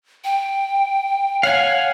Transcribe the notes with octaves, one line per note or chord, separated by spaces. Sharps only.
G5
C#5 F5 F#5 G#5